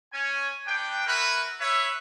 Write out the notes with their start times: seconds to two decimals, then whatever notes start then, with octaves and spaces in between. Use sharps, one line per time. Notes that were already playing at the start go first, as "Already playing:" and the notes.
0.13 C#4 G#5
0.66 B3 D4 G5
1.06 E4 F#4 A#4 B4
1.60 B4 C#5 E5